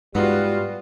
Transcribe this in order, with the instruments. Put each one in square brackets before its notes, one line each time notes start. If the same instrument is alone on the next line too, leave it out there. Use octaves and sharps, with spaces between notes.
[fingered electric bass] G#2 [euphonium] G3 [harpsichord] B3 [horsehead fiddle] F4 F#4